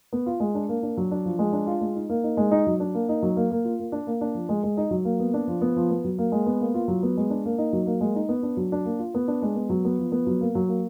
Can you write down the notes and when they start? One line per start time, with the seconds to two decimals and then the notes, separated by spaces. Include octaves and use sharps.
0.13 B3
0.26 F4
0.40 G#3
0.55 D4
0.69 A#3
0.83 D4
0.97 F#3
1.11 D4
1.25 F3
1.39 G#3
1.53 D4
1.67 F4
1.81 G#3
1.96 D#4
2.09 A#3
2.24 D#4
2.37 G#3
2.51 D#4
2.67 F#3
2.80 D4
2.95 A#3
3.09 D#4
3.22 F#3
3.37 A#3
3.51 A#3
3.65 F4
3.79 A#3
3.92 D4
4.07 A#3
4.21 D4
4.35 F3
4.49 G#3
4.63 G#3
4.77 D#4
4.91 F#3
5.05 A#3
5.20 B3
5.34 D4
5.48 F3
5.61 B3
5.76 F3
5.90 B3
6.04 F#3
6.18 A#3
6.32 G#3
6.46 B3
6.61 A#3
6.74 F4
6.88 F#3
7.03 B3
7.17 G#3
7.30 D4
7.45 A#3
7.58 D#4
7.73 F#3
7.87 A#3
8.01 G#3
8.16 D#4
8.29 B3
8.43 D4
8.57 F#3
8.72 D4
8.85 A#3
8.99 F4
9.14 B3
9.28 D4
9.42 G#3
9.56 B3
9.70 F#3
9.85 B3
9.99 F3
10.12 B3
10.27 F#3
10.41 A#3
10.55 F#3
10.68 A#3